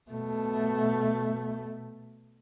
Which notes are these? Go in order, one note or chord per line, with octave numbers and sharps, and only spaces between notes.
B2 A3